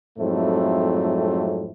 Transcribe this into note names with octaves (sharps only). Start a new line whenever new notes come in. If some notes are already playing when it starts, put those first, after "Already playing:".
F2 G#2 F#3 A3 C4 E4